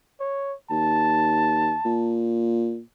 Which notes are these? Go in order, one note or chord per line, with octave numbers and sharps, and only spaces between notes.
C#5
D#2 A5
A#2